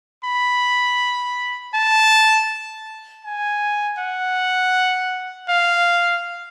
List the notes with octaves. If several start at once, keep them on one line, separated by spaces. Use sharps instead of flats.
B5
A5
G#5
F#5
F5